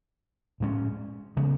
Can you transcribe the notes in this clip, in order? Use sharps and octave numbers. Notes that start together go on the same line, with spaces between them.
A2 G#3 C#4
C#3 E3 G#3 B3